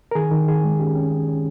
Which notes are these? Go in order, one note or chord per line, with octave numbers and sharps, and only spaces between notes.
A#4
D#3 G#4
D#3
D#3 G#4
G#3
C#4 G4
C#4
C#4
C#4